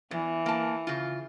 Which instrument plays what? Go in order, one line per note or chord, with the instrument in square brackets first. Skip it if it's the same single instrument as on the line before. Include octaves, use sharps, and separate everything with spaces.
[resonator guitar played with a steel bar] E2 [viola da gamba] E3
[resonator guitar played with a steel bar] A#3 A5
C#3 F4